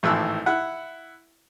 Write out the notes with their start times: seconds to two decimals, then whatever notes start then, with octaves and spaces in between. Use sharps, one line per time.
0.03 G#1 A2 E3 F3 E6 F#6
0.46 E4 F#5